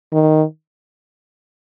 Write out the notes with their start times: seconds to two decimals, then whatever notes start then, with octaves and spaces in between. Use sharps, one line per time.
0.13 D#3